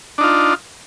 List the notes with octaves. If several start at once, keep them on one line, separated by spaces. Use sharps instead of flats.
D4 D#4 F4